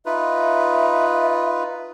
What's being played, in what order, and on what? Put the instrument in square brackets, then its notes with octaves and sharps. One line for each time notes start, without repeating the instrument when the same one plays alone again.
[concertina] D#4 F4 B4 [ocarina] E5